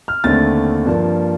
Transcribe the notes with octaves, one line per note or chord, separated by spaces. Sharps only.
F6
D#2 D3 A3 C4 A6
G2 F3 A#3